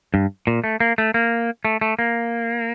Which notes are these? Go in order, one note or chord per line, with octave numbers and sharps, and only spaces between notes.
G2
A#2
A3
A#3
A3
A#3
A3
A3
A#3